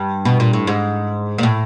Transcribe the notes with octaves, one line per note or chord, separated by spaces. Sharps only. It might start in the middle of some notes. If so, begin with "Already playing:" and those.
Already playing: G2
B2
A#2
A2
G#2
A#2
A2